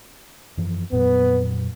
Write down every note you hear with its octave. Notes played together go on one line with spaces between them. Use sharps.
F#2 E3 F3
F2 A#2 F#3 B3